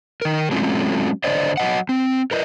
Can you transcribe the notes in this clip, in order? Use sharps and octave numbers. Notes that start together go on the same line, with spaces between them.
D#3 A#4
F#3 G#3 A3 C4 C#4 F4
D3 C5 D5 D#5
F#3 D#5 F#5
C4
A#4 B4 D#5